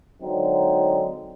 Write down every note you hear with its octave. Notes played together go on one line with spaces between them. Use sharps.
D3 F#3 G#3 C4 D#4